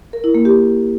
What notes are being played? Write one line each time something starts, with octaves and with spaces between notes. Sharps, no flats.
A#4
E4
A#3
G4